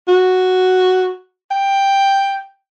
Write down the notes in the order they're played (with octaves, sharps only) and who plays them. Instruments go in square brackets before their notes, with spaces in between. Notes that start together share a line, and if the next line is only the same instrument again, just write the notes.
[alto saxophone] F#4
G5